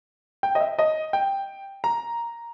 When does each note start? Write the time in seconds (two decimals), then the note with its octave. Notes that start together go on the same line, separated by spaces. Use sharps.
0.43 G5
0.55 D#5
0.61 E5
0.79 D#5
1.13 G5
1.84 A#5